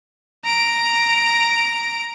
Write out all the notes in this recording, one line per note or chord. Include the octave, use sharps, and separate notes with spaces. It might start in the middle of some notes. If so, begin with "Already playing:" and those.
A#5 D7